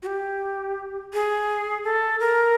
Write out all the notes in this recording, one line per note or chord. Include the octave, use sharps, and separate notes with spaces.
F#4
G4
G#4
A4
A#4